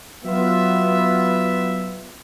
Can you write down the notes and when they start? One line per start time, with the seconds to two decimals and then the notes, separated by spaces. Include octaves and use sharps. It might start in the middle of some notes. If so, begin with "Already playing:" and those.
0.25 F#3 B3 F4 E5